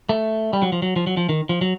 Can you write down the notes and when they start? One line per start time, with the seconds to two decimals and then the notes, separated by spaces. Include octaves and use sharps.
0.09 A3
0.53 G3
0.62 F#3
0.72 F3
0.82 F#3
0.96 F3
1.07 F#3
1.17 F3
1.29 D#3
1.49 F3
1.61 F#3